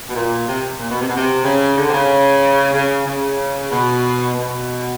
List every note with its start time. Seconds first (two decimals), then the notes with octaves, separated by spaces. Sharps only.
0.08 B2
0.15 A#2
0.47 C3
0.79 A#2
0.91 B2
1.01 C3
1.09 B2
1.17 C3
1.43 C#3
1.76 D3
1.88 C3
1.92 C#3
2.73 C#3
3.06 C#3
3.71 B2
4.35 B2